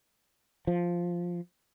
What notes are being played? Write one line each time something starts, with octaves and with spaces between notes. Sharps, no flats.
F3